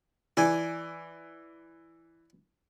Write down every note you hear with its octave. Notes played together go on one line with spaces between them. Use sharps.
E3 D5 G#5